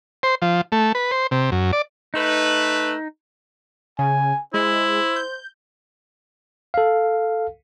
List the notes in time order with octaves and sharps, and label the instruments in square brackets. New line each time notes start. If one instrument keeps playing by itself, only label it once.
[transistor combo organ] C5
F3
A3
B4
C5
C3
F#2
D5
[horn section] A3 B4 [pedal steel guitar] D#4
[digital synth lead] C#3 [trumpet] G#5
[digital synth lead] G#3 [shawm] E4 [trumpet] C5
[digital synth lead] G6
[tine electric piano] A4 F5